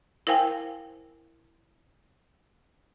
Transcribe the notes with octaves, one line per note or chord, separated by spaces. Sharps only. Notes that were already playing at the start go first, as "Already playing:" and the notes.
E4 A#4 C5 F5 G5 G#5